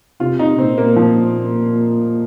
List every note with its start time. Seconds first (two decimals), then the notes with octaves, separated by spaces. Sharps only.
0.20 C3 F4
0.39 D#4
0.58 A#2 C4
0.78 A#3
0.96 F3